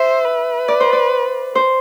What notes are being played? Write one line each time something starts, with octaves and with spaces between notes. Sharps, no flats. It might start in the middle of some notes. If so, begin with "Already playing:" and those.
Already playing: C5 E5
B4
D5
C5
D5
C5